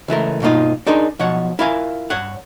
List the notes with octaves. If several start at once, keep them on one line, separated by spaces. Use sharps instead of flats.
C#2 E3 A3 A#4
G2 B2 A#3 D#4 F4
D4 D#4 G#4 A#4
B1 B2 F3 C#5 F#5
E4 F4 A#4 F5 G#5
G2 C#5 F#5